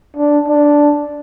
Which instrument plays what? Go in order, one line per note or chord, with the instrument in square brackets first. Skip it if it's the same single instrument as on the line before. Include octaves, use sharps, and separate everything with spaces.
[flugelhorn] D4
D4